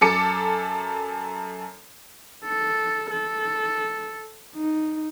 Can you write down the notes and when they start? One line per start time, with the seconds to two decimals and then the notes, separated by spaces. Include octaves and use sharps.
0.01 F#2 A4 D6 C#7
2.44 A4
3.11 A4
4.56 D#4